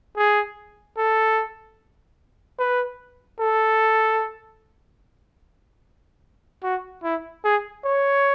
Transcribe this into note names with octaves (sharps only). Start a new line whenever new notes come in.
G#4
A4
B4
A4
F#4
E4
G#4
C#5